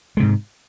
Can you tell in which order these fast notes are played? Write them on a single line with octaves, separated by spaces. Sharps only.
G#3 C3 G#2